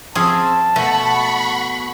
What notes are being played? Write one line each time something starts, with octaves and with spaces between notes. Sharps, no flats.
F3 C4 C#4 G#4 A5
B2 A3 F#5 B5 C#6